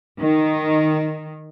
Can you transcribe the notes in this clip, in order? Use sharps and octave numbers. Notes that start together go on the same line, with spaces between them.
D#3